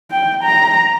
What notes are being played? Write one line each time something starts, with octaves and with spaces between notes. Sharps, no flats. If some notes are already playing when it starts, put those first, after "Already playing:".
G5
A#5